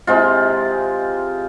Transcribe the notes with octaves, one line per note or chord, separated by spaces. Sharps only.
C3 G#3 F4